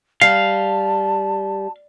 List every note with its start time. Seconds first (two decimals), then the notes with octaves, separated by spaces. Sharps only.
0.21 G3 F5 A5